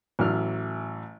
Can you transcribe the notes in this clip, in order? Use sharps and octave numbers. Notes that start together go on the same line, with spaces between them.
A1 E3 F#3 F6